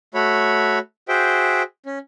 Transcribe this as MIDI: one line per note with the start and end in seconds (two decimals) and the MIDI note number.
0.14 0.79 57
0.14 0.79 66
0.14 0.79 73
0.14 0.79 83
1.09 1.62 66
1.09 1.62 68
1.09 1.62 72
1.09 1.62 76
1.09 1.62 79
1.86 1.99 61